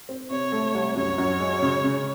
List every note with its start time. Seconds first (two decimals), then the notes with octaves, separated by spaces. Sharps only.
0.09 C4
0.30 C3 C#5
0.52 A3
0.74 C2
0.96 F#2 C#5
1.18 F#2
1.40 G#3
1.62 C#3
1.84 C#3